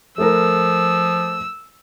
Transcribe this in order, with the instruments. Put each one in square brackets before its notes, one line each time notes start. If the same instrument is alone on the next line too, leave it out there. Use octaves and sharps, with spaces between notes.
[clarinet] F3 [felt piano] A3 A#4 [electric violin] E6